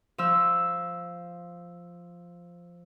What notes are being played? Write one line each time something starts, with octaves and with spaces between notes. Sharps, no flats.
F3 E6